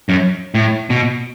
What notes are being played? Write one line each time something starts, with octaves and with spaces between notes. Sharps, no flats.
F#2
A2
B2